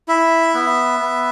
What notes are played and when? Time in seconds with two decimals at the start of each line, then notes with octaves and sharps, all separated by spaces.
0.08 E4 E5
0.55 B3
1.00 B3